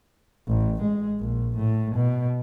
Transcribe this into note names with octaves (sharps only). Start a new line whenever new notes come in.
A1
G#3
A#1
A2
B2